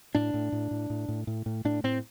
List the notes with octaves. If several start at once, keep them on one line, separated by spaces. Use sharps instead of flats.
A2 D4
A2
A2
A2
A2
A2
A2
A2
A2 D4
A2 C4